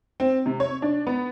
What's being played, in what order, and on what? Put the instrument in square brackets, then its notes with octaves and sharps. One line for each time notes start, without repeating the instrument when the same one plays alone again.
[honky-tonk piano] C4
C3
C#5
D4
B3